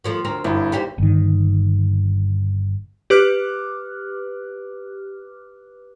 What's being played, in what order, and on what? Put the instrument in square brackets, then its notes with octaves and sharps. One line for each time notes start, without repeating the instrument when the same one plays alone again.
[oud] D#3 F3 A3
D2 C4 A#4
[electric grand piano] G1 E4 [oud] F#2
[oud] D#2 G4 C5
[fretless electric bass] G1 D#3
[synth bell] G4 B4 D6 F6 F#6